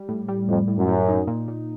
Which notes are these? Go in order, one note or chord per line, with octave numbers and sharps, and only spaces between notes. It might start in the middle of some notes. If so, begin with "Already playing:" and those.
Already playing: G3
A2
G3
F2 A2
A2
F#2
A2
D#4
A#2
A#2